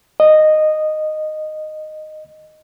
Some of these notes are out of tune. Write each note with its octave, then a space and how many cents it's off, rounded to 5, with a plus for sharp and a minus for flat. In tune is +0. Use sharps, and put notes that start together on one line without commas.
D#5 -10